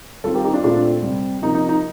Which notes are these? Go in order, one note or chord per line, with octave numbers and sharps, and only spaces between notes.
D#3 G3 C4 F4 A4
G4 A#4
D#4 G4
D4 F4
A#2 A3 C4 D4 F4
C3 G3 C4
C3 F3 A#3 D#4
D#4
D#4